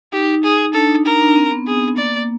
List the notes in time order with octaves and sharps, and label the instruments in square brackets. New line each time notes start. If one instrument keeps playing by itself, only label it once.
[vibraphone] D#4 [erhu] G4
[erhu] G#4
[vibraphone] D4 [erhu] A4
[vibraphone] D#4
[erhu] A#4
[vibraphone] D4
C4
B3
[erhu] G#4
[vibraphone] A#3 [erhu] D5